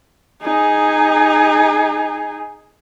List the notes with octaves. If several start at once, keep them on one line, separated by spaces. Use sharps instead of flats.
D#4 G#4